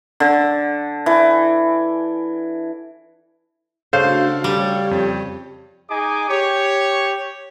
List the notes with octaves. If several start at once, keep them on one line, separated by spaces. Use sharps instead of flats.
D3
E3
C#3 A3 D4 F#4 A4 C5 F5
G3 G4 C#5
F2
D#4 G#4 D#5 G#5 D6
G4 C#5